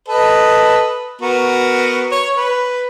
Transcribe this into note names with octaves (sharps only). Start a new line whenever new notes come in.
A4 B4 D#5
B3 F#4 A#4
C#5
B4